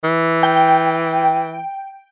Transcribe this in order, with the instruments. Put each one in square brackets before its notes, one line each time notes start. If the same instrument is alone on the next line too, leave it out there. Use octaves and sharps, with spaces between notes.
[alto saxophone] E3
[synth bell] G5